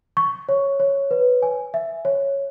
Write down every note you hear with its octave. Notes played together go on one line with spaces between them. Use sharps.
C#6
C#5
C#5
B4
G#5
E5
C#5